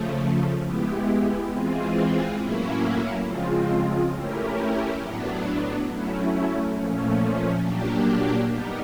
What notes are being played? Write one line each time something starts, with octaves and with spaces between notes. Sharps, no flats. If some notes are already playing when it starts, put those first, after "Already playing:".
Already playing: C#3 F3 A3
G#3 B3 E4 G4
E3 G#3 C4 F4 G#4
A2 F#3 A#3 C#4 E4
C#3 F3 G#3 C4 F4
A3 C#4 E4 G4 A#4
A2 F#3 B3 D4
F#3 A3 C#4 E4
A#2 F3 A3 C#4
A#2 F#3 A#3 D4 G4
G3 B3 D#4 G4 A#4